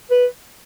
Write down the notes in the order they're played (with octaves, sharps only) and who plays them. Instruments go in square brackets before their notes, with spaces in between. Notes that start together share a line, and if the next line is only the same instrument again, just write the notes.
[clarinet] B4